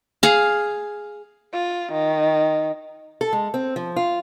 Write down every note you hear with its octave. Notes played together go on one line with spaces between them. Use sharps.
G#4 F5
F4
D#3
A4
G#3
C4
F3
F4